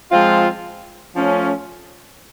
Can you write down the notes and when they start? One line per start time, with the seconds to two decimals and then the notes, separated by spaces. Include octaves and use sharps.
0.12 F3 G#3 C4 F4
1.16 F3 A3 C#4